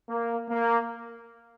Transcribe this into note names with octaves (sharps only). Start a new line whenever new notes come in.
A#3
A#3